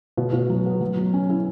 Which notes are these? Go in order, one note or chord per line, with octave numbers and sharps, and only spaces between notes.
B2
B2
F#3
B3
F#3
F#3
C#4
E4